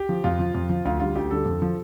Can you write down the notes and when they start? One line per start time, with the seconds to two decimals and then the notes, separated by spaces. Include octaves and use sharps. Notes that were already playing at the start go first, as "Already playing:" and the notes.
Already playing: G4
0.09 F3
0.24 F2 F4
0.39 F3
0.55 F2
0.69 F3
0.85 D2 F4
1.00 D3 G3 F4
1.15 D2 G4
1.31 D3 G3 A4
1.46 F2
1.62 F3